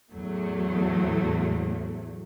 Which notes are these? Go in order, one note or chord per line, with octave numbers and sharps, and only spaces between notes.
E2 A2 F#3 A3